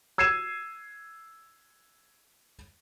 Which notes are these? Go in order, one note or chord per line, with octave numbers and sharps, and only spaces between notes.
E6 G#6 C7 D#7 E7